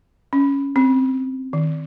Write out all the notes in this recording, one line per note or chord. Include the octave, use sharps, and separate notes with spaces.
C#4
C4
D#3